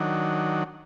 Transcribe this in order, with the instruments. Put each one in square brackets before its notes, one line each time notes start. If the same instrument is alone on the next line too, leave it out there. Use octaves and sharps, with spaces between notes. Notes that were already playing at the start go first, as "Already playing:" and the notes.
Already playing: [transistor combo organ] D#3 F#3 D4